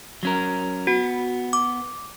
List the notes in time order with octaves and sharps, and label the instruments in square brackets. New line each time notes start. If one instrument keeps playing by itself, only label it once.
[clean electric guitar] F#3 C#4 A#4
[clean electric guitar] B3 [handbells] F#4
[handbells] D6